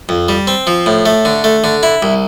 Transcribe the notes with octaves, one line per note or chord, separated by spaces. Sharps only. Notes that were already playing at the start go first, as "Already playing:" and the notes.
F2
G3
C4
F3
A2
A3
D3
A3
D3
E4
C2